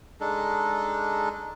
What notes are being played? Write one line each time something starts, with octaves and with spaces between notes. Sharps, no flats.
G#3 D4 D#4 A4